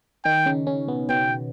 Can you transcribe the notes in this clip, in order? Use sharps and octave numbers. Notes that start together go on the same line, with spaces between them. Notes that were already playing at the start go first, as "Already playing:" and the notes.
D#3 D#4 G5
C#3 C#4
C#3 C#4
B2 B3
B2 B3 G5